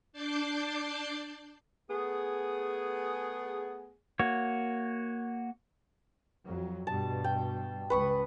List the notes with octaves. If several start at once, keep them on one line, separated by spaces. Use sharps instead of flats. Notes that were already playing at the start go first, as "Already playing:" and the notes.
D4 D5 A5 G6 A6 C7
A3 B3 G#4
A#3 F#4 C#5
F2 F#3
G2 B2 G3 A5
G5
C#2 B4 C#6 D#6